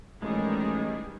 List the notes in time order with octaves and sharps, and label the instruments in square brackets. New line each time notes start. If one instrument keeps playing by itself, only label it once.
[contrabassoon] A1 [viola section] D#3 G3 G#4 [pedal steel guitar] G#3